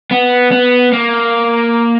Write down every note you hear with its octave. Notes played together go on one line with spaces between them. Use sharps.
B3
B3
A#3